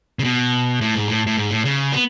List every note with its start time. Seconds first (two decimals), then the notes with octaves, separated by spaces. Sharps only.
0.19 C#3
0.24 B2
0.81 A2
0.95 G#2
1.08 A2
1.27 A2
1.37 G#2
1.51 A2
1.65 C#3
1.93 B3